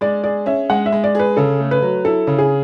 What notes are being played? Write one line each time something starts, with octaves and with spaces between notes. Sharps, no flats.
G#3 D5
G#4 D5
C#4 E5
G#3 F#5
E5
G#3
D5
G#4 B4
C#3 A4
A3
B4
F#3
E4 A4
C#3
G#4